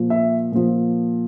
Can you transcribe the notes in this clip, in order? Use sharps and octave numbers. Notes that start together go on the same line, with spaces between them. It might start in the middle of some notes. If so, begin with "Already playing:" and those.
Already playing: A#2 F3
E5
A#2 F3